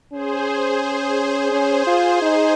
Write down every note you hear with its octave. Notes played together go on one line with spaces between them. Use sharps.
C#4 G#4 C5
C#4 G#4 C5
F4
D#4